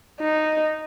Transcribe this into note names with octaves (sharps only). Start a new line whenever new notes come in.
D#4